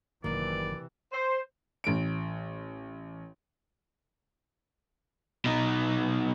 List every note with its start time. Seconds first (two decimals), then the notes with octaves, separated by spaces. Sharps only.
0.24 F#1 F#2 C3 D#3 E3 A#3 B4 D5
1.12 C5
1.84 A1 D7
5.45 B2 D#4